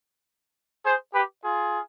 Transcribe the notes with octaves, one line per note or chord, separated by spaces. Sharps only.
G#4 C5
G4 B4
F4 G#4